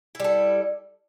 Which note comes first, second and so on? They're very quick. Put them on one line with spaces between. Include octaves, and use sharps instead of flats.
E4 G3 A4